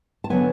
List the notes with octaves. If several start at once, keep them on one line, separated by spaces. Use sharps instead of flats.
A5
D3 F#3 B3 G#5